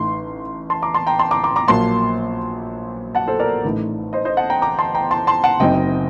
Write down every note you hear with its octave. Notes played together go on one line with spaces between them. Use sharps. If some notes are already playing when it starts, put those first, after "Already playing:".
Already playing: A1 A2 A3 D#4 C6
A5 C6
A#5 D6
A5 C6
G5 A#5
A5 C6
A#5 D6
A#5 D6
A#5 D6
A#1 A#2 F#3 A#3 A5 C6
F#5 A5
A4 C5
A#4 D5
A1 A2 A3 D#4
C5 D#5
C5 D#5
F#5 A5
G5 A#5
A#5 D6
A5 C6
G5 A#5
A5 C6
A5 C6
F#5 A5
F#1 F#2 F#3 C4 D#4 D#5 G5